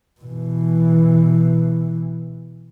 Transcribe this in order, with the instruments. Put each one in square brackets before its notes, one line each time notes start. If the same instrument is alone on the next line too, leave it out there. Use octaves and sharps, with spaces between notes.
[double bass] B2 E3